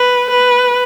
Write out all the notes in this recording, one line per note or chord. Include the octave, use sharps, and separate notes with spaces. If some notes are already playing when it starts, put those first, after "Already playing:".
Already playing: B4
B4